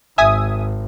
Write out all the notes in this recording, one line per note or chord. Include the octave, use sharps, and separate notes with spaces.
G#1 E5 G#5 D#6